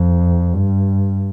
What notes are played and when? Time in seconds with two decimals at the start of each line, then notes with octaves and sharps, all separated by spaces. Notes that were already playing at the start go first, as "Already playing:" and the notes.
Already playing: F2
0.54 G2